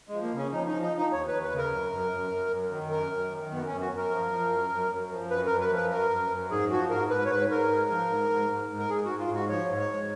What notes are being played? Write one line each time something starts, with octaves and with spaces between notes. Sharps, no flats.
F3 G#3
A#3
C#3 C#4
F3 D#4
D#4
F3
D#4
F3
D#4
D#2 C#5
B4
D#2
B4
C#3 A#4
F#2
F#2
F#2
F#2
F#2
D#3
F#2 A#4
F#2
D#3
F#2 B3
C#4
F#2
F#4
F#2
A#4
F3
F3
F#2
F#2
F#2
F3
F#2 B4
F#2 A#4
B4
F3 B4
F#2 A#4
F#2
F#2
G#2 G#4
F3 F#4
G#2 A#4
G#2 B4
C#5
G#2 B4
G#2 A#4
G#2
F3
G#2
G#2
G#2
G#2
A#4
G#2 G#4
G#2 F#4
F4
G#2
F#4
F3 C#5
G#2
C#5
G#2